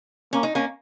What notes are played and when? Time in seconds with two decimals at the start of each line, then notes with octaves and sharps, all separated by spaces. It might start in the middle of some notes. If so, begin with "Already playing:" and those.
0.33 A#3 C#4
0.43 D#4
0.55 A#3 C#4